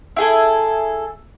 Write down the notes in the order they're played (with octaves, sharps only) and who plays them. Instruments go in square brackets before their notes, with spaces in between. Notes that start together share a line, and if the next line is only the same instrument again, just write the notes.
[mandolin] E4 G#4 A4